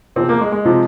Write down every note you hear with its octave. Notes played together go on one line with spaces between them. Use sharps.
E2 C3 F3 C4
A#3
G#3
G#3
C3 F3